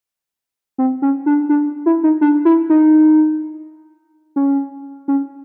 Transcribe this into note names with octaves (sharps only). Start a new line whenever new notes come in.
C4
C#4
D4
D4
E4
D#4
D4
E4
D#4
C#4
C#4